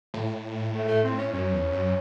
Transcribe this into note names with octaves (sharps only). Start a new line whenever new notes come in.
A2
A3
A3
C4
C#4
F#2 C#4
E2
F#2